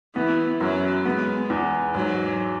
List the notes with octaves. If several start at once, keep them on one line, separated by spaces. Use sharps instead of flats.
E3 B3
F#2 F#3
G#3 B3
E2
G#2 F#3